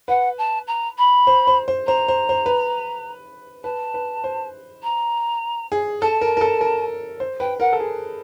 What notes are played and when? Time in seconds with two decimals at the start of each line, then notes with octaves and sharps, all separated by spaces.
0.08 B4 F#5
0.38 A5
0.67 A#5
0.98 B5
1.27 C5
1.47 C5
1.68 C5
1.87 C5 A#5
2.08 C5
2.29 C5
2.46 B4
3.64 B4 A5
3.94 B4
4.24 C5
4.83 A#5
5.72 G#4
6.02 A4 A5
6.21 A#4
6.37 A#4
6.41 A4
6.61 A#4
7.20 C5
7.40 B4 G5
7.60 A#4 F#5
7.73 A4
7.80 G#4